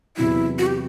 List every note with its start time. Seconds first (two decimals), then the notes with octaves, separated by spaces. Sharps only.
0.17 E2 C3 F#3 E4
0.59 F#4
0.66 G4